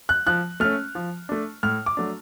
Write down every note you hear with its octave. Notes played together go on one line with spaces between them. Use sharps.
F#6
F3 F#6
A3 C#4 F6
F3
A3 D4
A2 F6
D6
F#3 A3 D4